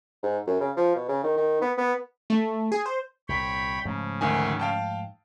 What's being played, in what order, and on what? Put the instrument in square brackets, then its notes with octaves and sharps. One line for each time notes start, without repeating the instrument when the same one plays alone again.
[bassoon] G#2
F#2
C#3
F3
B2
C#3
D#3
D#3
B3
B3
[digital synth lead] A3
G#4
C5
[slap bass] C2 A#2 [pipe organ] C#5 G5 B5
[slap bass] G#2 F3 A3 [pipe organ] C#3
[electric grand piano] D2 D#3 G#5
F5 G5 A5